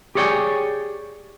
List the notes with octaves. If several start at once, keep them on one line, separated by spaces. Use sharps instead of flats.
G4 G#4 C#5 D5 G5 G#5